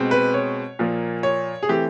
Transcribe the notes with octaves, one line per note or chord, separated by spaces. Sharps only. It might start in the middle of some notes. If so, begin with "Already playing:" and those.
Already playing: B2 G#3 C4
B4
C#5
A#2 F3 A#3
C#5
G#4
E3 A3 C4 G4